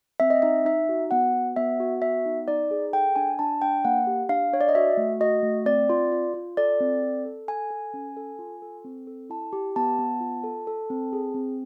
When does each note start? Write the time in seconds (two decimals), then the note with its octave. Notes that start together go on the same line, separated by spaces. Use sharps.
0.20 C4 E5
0.30 D#5
0.42 D#4 E5
0.65 D#4 E5
0.89 F#4
1.11 B3 F#5
1.34 F#4
1.56 B3 E5
1.80 F#4
2.02 B3 E5
2.26 D#4
2.48 D#4 D5
2.71 G#4
2.93 A4 G5
3.16 D4 G#5
3.39 D4 A5
3.62 D4 G5
3.85 A#3 F#5
4.07 G4
4.29 D4 F5
4.53 D4 C#5
4.61 D5
4.69 D#5
4.75 F#4 E5
4.97 A3
5.20 F#4 D#5
5.43 A3
5.66 C4 D5
5.90 F4
6.12 F4
6.34 F4
6.57 A4 D5
6.80 C4
7.03 A4
7.25 A4
7.48 A4 G#5
7.71 A4
7.94 C#4
8.17 A4
8.39 F4
8.62 A4
8.84 C4
9.07 A4
9.30 E4 A5
9.53 G4
9.76 B3 A5
9.99 B3
10.21 F4
10.44 A4
10.67 A4
10.90 C4
11.13 G#4
11.34 C4